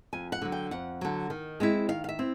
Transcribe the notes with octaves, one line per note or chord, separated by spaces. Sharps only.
F2 G#5
F#5
D3 F#3
G5
F2 F#5
D3 F#3
D#3
G#3 C4 E4
D#3 F5
F5
E5
C4 E4